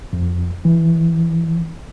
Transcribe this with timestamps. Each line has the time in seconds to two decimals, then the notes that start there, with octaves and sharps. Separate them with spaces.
0.13 F2
0.65 E3